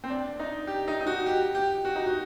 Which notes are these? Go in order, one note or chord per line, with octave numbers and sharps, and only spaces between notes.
C4
D4
D#4
G4
D#4
D#4
F#4
G4
G4
F#4
D#4
F#4